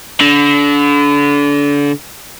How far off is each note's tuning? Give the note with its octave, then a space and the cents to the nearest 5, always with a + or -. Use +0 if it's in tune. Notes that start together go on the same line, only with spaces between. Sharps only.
D3 -30